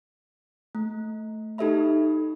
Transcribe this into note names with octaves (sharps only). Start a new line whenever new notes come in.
A3
D#4 G4 A4 D#5 E5 B5